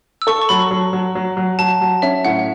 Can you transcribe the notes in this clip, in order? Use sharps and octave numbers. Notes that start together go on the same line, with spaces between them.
E6
A4 C#6
C#6
F#3 B5
F#3
F#3
F#3
F#3
F#3 A5
F#3
C#4 E5
A2 F#5